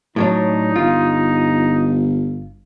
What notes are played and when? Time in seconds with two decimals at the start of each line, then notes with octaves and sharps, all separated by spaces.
0.16 A2 F#3 D4 D#4
0.76 G1 F4